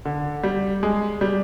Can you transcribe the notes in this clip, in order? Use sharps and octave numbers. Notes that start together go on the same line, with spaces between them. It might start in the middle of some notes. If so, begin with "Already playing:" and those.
D3
G3
G#3
G3